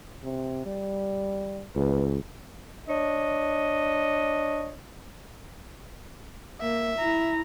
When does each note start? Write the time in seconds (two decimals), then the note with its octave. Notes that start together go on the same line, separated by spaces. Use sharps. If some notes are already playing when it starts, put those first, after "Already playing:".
0.24 C3
0.66 G3
1.76 C#2 B4
2.89 D4 C#5 D#5
6.61 A#3 E5
6.99 E4 A#5